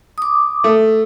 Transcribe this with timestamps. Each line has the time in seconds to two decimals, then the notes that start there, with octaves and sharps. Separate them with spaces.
0.18 D6 D#6
0.64 A3